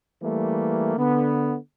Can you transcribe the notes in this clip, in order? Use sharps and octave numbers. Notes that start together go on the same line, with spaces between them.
E3 G3 A3 A#3
D3 B3